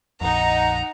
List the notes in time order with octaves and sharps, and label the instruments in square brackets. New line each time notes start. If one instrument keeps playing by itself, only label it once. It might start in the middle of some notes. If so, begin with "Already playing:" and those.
[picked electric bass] A#1 F2 [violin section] D#4 [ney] F#5 [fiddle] A#5